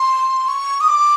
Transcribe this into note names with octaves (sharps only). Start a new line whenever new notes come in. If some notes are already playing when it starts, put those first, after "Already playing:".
Already playing: C6
C#6
D#6
D6